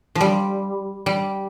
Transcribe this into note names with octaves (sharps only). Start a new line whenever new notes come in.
F3
G3
G3